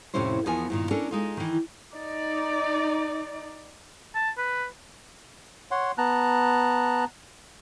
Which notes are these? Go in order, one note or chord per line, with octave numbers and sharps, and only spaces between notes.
F2 A2 C3 C#4 E4 C5
E2 F3 B3 A#4 G#5
G2 A#2 D#3
C#4 D4 A4 A#4
G#3 D#4 F4
D#3 E3
D#4 D5
A5
B4
C#5 F#5 C6
B3 A5 A#5 F#6